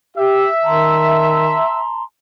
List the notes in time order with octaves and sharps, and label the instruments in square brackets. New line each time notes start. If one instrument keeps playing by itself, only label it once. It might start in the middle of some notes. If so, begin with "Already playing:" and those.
[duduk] G4 [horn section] E5
[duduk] D#3 [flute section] A5 A#5 C6